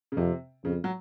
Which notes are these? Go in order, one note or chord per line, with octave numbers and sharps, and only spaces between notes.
C#3
F2 C3
F2 C#3
F#3